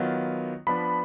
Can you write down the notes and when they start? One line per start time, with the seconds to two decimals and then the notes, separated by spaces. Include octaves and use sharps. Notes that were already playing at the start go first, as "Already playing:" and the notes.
Already playing: D#3 F#3 B3 F4
0.67 F3 B3 D4 B5